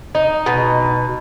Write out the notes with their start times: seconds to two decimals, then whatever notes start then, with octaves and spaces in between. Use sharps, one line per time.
0.15 D#4
0.46 B2